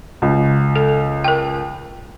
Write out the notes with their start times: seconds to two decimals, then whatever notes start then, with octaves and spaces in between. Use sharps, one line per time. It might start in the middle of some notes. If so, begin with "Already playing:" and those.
0.22 C#2
0.76 A4
1.24 A#4 G5